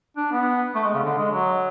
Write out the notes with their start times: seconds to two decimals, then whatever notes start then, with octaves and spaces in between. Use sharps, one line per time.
0.17 D4
0.32 B3
0.75 A3
0.84 G#3
0.94 C#3
1.03 D3
1.18 G#3
1.32 F#3